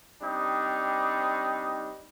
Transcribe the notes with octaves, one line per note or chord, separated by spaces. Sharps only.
G3 C4 D4 D#4